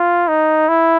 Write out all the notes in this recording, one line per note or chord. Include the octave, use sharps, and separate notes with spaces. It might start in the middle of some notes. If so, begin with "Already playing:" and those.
Already playing: F4
D#4
E4